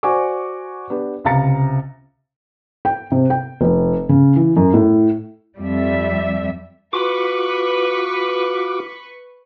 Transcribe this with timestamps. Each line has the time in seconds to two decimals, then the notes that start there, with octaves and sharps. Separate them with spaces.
0.03 F#4 C5 D5 G#5 C#6 D6
0.90 B3 D4 G4
1.25 C#2 C3 F5 A#5 A6 C#7
2.85 G5
3.12 C3
3.30 G5
3.61 F1
4.09 C#3
4.36 E3
4.57 F#2
4.74 A2
5.58 F2 G3 E5
6.93 F4 F#4 B4 B5 C#6 D6